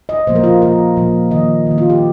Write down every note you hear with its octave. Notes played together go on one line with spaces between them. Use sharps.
D#5
A#2 F3 A#3 C5
A#4
F4
A#2 F3 A#3 A#4
A#2 F3 A#3
D#3 A#3 D#5
D#3 A#3
F4
G4